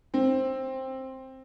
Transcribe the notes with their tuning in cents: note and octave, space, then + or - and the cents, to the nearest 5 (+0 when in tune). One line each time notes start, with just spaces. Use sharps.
C4 +10